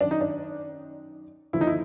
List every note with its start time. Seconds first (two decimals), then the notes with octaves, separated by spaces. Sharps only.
0.01 F#2 D#3 D4
0.11 D#4
0.21 D4
1.53 D#2 D3 F3 E4
1.61 D#4
1.67 E4